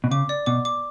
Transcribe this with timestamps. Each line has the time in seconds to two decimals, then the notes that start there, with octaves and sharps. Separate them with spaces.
0.04 B2
0.11 C#3 D6
0.29 D5
0.46 B2 D6
0.65 D6